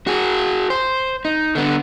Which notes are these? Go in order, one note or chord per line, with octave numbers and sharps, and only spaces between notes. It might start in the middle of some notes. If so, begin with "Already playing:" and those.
F#4 G#4
C5
D#4
D3 B3